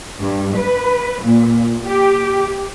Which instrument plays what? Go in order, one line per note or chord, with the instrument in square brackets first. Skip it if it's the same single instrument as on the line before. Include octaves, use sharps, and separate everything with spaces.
[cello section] G2
B4
A#2
G4